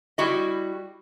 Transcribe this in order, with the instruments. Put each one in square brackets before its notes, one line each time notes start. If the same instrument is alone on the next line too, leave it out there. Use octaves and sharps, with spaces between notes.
[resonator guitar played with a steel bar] G3 E4 F#4 D#5